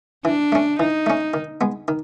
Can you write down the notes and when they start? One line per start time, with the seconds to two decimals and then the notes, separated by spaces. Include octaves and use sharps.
0.25 E3 D4
0.52 A3 C#4
0.79 E3 D#4
1.06 A3 C#4
1.34 D#3
1.61 G#3 B3
1.88 D#3